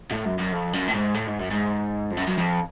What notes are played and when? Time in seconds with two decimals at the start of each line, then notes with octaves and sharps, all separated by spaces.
0.11 A2
0.25 F#2
0.38 F#2
0.52 F2
0.73 F#2
0.88 A2
0.94 G#2
1.14 A2
1.27 G#2
1.39 F#2
1.51 G#2
2.11 F2
2.17 F#2
2.28 F#2
2.38 F2